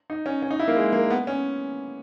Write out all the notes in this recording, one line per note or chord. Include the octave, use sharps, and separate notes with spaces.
D#4
C#4
C#4
D#4
E4
A#3
G#3
A#3
B3
C#4